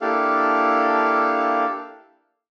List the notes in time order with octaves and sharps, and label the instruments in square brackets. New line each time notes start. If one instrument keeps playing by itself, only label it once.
[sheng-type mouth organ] A#3 D4 E4 G4 A4 F5